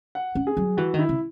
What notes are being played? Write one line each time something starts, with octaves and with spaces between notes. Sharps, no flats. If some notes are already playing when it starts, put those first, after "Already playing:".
F#5
C#4
G#4
F#3
E3 F#4
D#3
E4
C#3